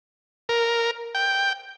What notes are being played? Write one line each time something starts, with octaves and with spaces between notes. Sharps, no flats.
A#4
G5